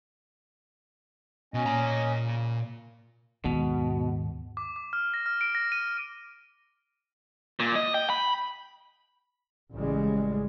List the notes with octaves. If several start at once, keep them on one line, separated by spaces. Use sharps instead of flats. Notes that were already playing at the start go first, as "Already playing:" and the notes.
B2 C#4 D#5
A#2 A#5
C#3
D#2 G#2 B2
D6
D6
F6
A#6
F6
D7
A#6
D#7
A#2
D#5
G5
B5
A1 C#3 G3 G#3